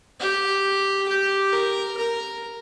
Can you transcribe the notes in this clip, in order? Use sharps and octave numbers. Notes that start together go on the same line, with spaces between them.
G4
G4
A#4
A#4